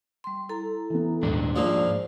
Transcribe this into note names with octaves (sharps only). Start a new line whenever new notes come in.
G3 C6
E4 A4 A#5
E3 B3
D#1 G#2 D4
A#2 F3 G#3 C5